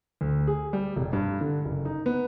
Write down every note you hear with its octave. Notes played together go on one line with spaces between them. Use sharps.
D2
G#4
G3
F1
G2
D3
F#1
D#4
B3